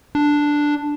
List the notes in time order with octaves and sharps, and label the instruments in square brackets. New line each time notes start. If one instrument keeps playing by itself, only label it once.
[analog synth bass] D4